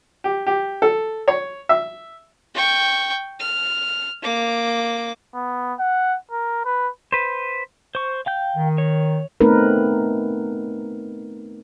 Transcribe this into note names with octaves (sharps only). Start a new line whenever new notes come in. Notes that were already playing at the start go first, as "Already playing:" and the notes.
G4
G4
A4
C#5
E5
G5 C#6
F6
A#3 D6
B3
F#5
A#4
B4
B4 C5
C5 C#6
F5 G5 G6
D#3
C#5
A3 B3 C4 D#4 A#4 B4